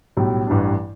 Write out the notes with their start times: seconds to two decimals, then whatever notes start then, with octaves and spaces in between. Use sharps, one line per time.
0.17 B1 A2 G3
0.47 A1 G2 E3 G3 D4